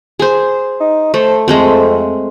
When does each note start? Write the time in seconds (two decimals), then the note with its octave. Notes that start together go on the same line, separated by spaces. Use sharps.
0.19 G#4 C5
0.80 D#4
1.14 A3 C5
1.48 F2 G#3 A3 C4